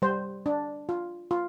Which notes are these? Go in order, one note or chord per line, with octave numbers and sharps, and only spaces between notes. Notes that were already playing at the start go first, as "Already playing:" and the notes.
G3 C5
D4
F4
F4